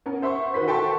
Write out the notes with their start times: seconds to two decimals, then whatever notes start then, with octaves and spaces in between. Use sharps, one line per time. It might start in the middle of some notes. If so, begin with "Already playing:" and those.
0.06 B3 C#4 A#4
0.22 C5 E5 F#5 C6 C#6
0.54 D#3 F#4 B4 C5 B6
0.67 F#4 A4 G5 A5 C6 C#6